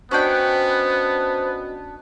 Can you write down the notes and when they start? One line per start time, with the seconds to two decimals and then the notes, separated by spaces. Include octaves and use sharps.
0.11 B3 C#4 D4 F#4 C5 D#5 G5